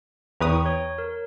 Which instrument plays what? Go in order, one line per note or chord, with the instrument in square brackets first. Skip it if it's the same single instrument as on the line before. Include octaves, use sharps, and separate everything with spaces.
[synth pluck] E2 B4 D#6 [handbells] G5 A#5 C#6
[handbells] C#5
A#4